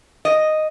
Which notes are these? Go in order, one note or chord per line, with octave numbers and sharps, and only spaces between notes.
D#5